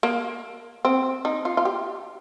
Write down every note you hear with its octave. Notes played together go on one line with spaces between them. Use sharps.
A#3
C4
D#4
F4
F4
G4